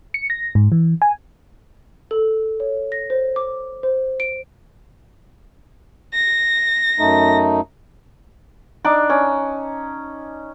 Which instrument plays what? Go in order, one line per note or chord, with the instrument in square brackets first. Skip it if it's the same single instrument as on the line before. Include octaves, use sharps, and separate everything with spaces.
[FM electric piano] C#7
A#6
G#2
E3
G#5
[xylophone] A4
C#5
A#6
C5
D6
C5
D7
[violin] A#6
[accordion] F#2 A3 D#4
[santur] D4 D#4 D6
C#4